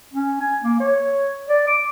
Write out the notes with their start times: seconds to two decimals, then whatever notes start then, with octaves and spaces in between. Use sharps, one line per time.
0.13 C#4
0.40 G#5
0.63 A#3
0.80 C#5
1.49 D5
1.67 D6